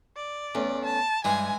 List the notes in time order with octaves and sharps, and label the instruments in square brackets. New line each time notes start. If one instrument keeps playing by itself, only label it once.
[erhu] D5
[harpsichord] E2 [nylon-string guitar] A3 C#4
[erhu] A5
[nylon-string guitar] G2 [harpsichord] E3 G#3 [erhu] G#5